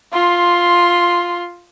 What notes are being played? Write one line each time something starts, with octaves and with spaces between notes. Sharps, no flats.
F4 C6